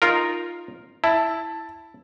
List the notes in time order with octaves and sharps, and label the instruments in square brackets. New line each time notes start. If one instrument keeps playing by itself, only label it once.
[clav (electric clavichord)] D#4 F4 A#4
[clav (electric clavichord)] E4 [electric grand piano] A5